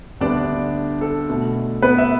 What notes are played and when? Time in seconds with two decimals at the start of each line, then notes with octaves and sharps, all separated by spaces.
0.21 D2 D3 G3 B3 D4 D5
1.01 A4
1.29 B2 A3
1.82 B3 B4
1.98 E5